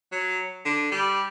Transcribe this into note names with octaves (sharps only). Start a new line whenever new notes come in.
F#3
D3
G3